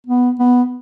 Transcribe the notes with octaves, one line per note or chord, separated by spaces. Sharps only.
B3
B3